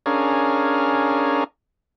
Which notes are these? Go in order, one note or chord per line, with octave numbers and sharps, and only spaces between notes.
C#4 D4 G#4 A#4 F5